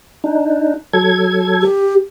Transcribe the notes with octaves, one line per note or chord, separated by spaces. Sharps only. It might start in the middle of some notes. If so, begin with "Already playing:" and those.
D4 D#4
F#3 A4 G#6
G4